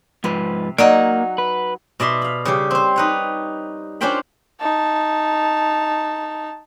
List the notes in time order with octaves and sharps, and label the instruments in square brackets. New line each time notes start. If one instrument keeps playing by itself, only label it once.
[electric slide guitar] G#2 F3 B4 [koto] C3
[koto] F#3 D#4 F#5 [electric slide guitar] A#3 [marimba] D5 D#5
[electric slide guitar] B4
[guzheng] B2 D5 E5 C6
F5 B5
C#3 G3 G4
C4 C5
D#4 B4 C#5
C#4 D4 F4 C5 G5 B5
[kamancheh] D#4 A5